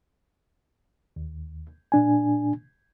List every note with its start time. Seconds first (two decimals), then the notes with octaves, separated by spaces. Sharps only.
1.16 D#2
1.92 A#2 D4 G#5